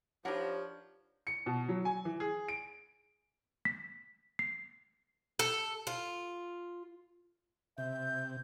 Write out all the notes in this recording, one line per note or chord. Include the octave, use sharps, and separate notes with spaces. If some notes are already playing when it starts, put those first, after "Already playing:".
F3 D4 D#4 G4 A#4 B4 C#5 F#5
C#7
B2
F#3
G#5
E3
G#4
D7
B6
C7
A4
F4
C3 E5 G6